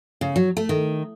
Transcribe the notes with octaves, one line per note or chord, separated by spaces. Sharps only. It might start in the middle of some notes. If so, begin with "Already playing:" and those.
C#3
F#3
A3
D#3